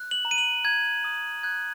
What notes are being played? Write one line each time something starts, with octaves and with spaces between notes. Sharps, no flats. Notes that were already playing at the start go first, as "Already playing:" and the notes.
Already playing: F#6
F#7
A#5
D#7
F#7
A#5 G#6
D#6
F#6 G#6